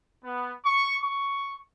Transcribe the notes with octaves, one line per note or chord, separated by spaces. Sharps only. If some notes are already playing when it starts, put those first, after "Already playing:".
B3
C#6
C#6